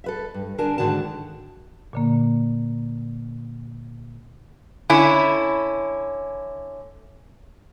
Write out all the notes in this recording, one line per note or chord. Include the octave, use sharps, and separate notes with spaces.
A4 B4 E5
G2
D3 D4 A#4 G#5 A5
G#2 D3 D#3 F#4 A5
A#2 D3 A#3
D3 C#4 E4